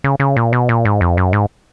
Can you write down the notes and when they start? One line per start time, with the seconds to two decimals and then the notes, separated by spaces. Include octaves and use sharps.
0.04 C#3
0.20 C#3
0.36 A#2
0.53 B2
0.69 A#2
0.85 G#2
1.01 F2
1.17 F#2
1.33 G#2